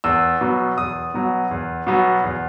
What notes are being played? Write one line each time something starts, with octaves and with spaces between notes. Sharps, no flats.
E2 E6
B2 F#3 B3
E2 D#6
B2 F#3 B3
E2
B2 F#3 B3
E2